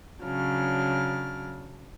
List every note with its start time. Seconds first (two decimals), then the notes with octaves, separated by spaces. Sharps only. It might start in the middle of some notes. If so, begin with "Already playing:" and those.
0.24 C#3 F#3 D4 F6